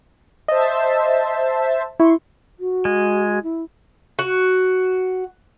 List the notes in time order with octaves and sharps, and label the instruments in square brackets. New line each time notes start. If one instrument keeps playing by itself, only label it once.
[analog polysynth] C5 E5 A5 [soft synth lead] D#5
[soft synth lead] E4 [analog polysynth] C6 C#6
[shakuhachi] F#4
[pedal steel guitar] G#3
[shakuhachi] E4
[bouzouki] F#4